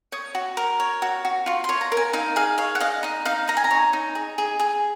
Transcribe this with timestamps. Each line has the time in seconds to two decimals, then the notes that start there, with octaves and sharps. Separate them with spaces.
0.12 C#5 D#6
0.35 F#4
0.57 A#4
0.80 C#5
1.02 F#4
1.25 F#4
1.46 F4 C#6
1.64 C6
1.69 C#5
1.81 A#5
1.92 A#4
1.97 G#5
2.13 D#4 F5
2.36 G#4 F5
2.58 C#5 F5
2.75 F#5
2.80 D#5 F5
3.03 D#4 D#5
3.25 D#4 F5
3.48 D#4 A#5
3.57 G#5
3.64 A#5
3.71 C#5
3.93 D#4
4.15 G#4
4.38 G#4
4.59 G#4